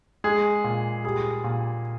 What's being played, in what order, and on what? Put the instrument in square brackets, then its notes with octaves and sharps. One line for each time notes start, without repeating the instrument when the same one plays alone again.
[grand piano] G#3 G#4
A#2
G3 G#4
A#2